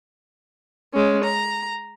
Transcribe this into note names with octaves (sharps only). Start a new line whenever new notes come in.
G#3 C#4
A#5